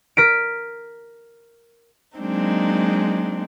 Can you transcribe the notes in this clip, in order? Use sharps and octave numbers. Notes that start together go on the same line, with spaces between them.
A#4 B6 D7
F#3 G#3 A#3 C4 D4 D#4